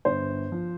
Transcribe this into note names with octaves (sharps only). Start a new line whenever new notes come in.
G1 C5
F3